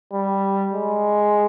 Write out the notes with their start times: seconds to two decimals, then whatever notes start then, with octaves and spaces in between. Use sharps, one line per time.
0.13 G3
0.74 G#3